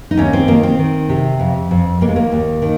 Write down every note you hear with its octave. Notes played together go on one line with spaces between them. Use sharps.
D#4
D#2 C#4
C4
D#3 A#3
C4
D#3
C3
F2
F2
D#2 A#3
G#3
A#3
D#2
D#3